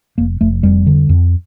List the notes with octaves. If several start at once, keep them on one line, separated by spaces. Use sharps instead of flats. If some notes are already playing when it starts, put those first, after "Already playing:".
F1 A#3
F1 A3
F2 G3
D3
F2